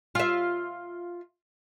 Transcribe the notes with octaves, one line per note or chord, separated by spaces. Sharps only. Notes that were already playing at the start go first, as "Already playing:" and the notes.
F4 E5